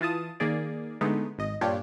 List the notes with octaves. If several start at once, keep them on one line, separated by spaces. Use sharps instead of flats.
E3 F4 A5 D#6
D#3 A#3 G#4 D5
D3 G#3 A3 B3 D#4
G#1 D#5
G2 A#2 D4 F4 G4 C#5